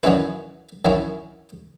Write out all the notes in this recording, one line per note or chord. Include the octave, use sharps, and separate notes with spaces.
F#2 D#3 F#3 C#4 E4 B4
F#2 D#3 F#3 C#4 E4